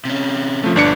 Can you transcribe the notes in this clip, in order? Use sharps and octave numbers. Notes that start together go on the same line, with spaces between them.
C3 C#4
F3 A3
G1 A#2 F3 D4 C#7